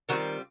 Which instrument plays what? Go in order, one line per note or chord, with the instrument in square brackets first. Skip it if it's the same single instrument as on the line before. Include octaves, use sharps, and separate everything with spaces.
[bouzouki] D#3 G3 C4 F4 F#4